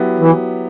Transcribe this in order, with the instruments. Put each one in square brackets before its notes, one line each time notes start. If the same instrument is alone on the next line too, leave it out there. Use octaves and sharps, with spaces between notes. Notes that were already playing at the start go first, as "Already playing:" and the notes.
Already playing: [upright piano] F#3 B3 E4 G4
[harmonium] E3